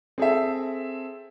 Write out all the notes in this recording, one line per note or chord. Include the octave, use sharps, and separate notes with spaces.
C4 G#4 A4 E5